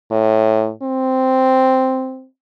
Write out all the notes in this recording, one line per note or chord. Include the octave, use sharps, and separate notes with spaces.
A2
C4